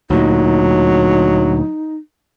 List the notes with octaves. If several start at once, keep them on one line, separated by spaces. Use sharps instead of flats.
D2 A#2 F#3 D#4